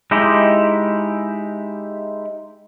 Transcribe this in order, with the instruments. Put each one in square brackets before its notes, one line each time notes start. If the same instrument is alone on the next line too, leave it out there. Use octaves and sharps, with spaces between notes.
[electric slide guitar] G#3 D#4 E4 G4